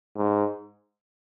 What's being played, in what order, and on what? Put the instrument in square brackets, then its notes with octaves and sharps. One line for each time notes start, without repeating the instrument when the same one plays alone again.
[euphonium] G#2